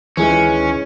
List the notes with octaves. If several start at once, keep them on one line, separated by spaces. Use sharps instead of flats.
D2 D#3 E3 G#3 C#4